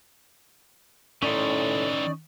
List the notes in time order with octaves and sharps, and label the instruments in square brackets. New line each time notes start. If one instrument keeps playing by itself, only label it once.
[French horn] A2 [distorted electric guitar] D#3 E3 [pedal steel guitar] C#4 D#4 C6 [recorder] D5